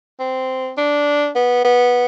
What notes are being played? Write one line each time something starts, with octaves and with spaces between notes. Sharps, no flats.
C4
D4
B3
B3